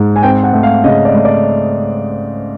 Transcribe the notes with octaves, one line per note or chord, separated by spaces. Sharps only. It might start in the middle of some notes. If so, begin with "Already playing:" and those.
Already playing: G#2
G#5
C4 G5
F#5
A3
F5
C#3 D#5
D5
A3
D5